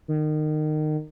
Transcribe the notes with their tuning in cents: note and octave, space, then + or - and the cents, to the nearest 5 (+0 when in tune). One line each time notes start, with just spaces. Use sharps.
D#3 -25